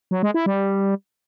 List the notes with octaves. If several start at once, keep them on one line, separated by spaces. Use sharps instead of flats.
F#3
G#3
E4
G3